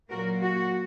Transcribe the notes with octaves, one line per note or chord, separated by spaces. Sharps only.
A#2 F#3 A#3 F#4 A#4
F#4